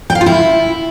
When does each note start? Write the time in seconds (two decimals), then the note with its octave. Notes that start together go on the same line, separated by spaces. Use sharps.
0.10 G5
0.15 F5
0.21 F4
0.26 E4